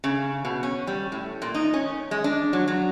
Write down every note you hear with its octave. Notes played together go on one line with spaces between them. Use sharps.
C#3
B2
C#4
G3
A2
A#2
D#4
C#4
G#3
D4
F#3
F#3